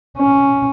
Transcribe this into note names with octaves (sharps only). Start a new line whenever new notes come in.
C#4